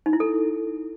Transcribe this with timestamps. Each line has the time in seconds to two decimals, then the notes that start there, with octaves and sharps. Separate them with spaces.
0.06 D#4
0.13 E4
0.20 A4